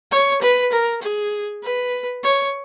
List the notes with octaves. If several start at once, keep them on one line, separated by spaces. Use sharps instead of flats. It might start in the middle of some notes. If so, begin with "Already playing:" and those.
C#5
B4
A#4
G#4
B4
C#5